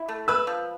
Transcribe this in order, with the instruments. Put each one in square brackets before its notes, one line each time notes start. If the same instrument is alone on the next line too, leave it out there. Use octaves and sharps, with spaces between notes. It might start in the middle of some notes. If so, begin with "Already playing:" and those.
Already playing: [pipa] E4
A3
[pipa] B4 [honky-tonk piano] E6
[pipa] F3